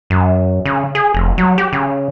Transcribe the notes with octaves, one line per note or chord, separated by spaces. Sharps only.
F#2
C#3
G#4
F1
F#3
G4
C#3